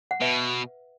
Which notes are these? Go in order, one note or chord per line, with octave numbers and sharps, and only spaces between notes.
F#5
B2 B4 E5